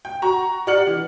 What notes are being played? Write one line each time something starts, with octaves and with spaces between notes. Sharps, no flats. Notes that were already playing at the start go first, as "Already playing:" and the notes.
G5
F#4 A#5 C#6
G4 D5 F#5 F6 C#7 F#7
E3